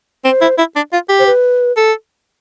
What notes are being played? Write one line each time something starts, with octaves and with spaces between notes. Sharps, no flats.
C4 C5
E4
E4
D4
F4
G4
C5
B4
A4